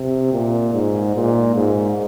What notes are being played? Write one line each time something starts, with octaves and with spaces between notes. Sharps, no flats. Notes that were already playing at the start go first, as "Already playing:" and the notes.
Already playing: C3
A#2
G#2
A#2
G#2